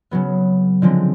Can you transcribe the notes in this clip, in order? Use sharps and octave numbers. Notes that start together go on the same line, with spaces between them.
C#3 F#3 B3
D3 F3 G#3 C4